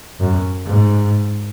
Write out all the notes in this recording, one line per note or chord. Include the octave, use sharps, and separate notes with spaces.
F#2
G#2